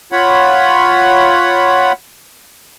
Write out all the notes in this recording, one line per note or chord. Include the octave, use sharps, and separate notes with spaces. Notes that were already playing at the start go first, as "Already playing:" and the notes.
F4 C#5 F#5 B5